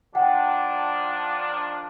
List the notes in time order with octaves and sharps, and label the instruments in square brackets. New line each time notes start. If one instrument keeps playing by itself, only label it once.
[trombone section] D#3 F3 D4 [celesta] F#5 G5